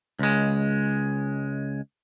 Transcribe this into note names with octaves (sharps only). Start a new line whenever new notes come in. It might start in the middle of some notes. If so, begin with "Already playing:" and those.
C#2 G#3